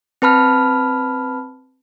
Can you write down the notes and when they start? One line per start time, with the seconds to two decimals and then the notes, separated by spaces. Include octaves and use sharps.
0.22 C4 B4 A5 B5 F6